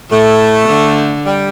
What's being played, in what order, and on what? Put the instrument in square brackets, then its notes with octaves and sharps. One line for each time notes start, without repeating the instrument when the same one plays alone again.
[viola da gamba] A2 [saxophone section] A3
[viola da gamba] D3
[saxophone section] G3